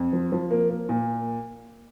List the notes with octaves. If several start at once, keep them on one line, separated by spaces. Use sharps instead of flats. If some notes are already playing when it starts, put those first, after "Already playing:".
Already playing: F2
F3
F3
A#3
A#3
A#2